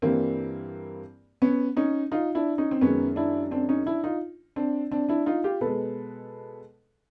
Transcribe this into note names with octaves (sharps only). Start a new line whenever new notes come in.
G2 E3 G3 A#3 C4
B3 C#4
C#4 D#4
D#4 F4
D4 E4
C#4 D#4
C4
F#2 D#3 G#3 B3 C#4
D4 E4
C4 D4
C#4 D#4
D4 E4
D#4 F4
C4 D4
C4 D4
D4 E4
D#4 F4
F4 G4
B2 G#3 A4 B4